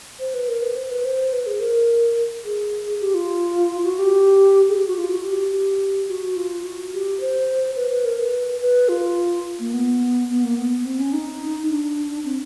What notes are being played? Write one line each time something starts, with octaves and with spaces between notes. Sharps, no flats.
C5
B4
A#4
B4
C5
B4
C5
B4
G#4
A#4
G#4
G4
F4
F#4
G4
G#4
G4
F#4
F4
F#4
G4
G4
F#4
F4
F#4
G4
C5
B4
B4
A#4
B4
B4
F4
A#3
B3
B3
A#3
B3
C4
C#4
D#4
D4
C4